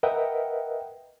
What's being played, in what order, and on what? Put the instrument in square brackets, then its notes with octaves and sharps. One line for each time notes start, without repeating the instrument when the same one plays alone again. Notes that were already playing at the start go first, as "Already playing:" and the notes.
[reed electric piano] A#4 B4 D#5 E5 F#5 G5